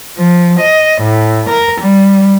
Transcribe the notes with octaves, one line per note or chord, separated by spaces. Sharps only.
F3
D#5
A2
A#4
G3